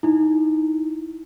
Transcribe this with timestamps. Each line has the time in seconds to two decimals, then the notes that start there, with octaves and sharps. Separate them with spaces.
0.03 D#4 E4